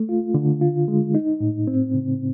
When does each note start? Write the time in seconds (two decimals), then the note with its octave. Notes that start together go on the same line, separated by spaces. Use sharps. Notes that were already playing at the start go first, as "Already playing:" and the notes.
Already playing: A3
0.09 F4
0.34 D3
0.61 F4
0.88 G#3
1.15 D#4
1.40 A2
1.67 C4
1.94 C#3